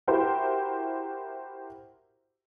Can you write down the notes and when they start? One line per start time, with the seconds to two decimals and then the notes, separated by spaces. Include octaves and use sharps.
0.07 E4 F#4 G4 A#4 C5